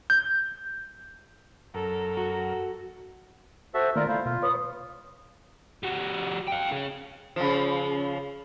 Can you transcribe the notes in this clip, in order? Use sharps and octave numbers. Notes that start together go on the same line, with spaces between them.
G6
F#2 A4 A#4
F#4
F#4 A4 C5 E5
D#3 A3 A#3 F4 A#4 D5
A3 E4 C5 F5
B2 F4
B4 C#5 D#6
G3 F#4
F5 G5
C#4 G#4
C#3 F3